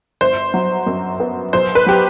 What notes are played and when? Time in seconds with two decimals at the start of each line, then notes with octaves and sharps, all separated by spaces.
0.21 G1 C5
0.54 F#3
0.87 F#2
1.20 B3
1.53 B1 C5
1.75 B4
1.86 F#3 G4